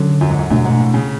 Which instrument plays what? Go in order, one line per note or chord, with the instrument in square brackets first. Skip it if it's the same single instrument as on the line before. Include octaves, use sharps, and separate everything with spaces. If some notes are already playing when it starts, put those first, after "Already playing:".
Already playing: [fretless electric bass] D3 F#3 C#4
[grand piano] F#2
G#2
F#2
[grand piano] F#2 [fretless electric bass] B2 A3 D4
[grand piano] G#2
A2
C#3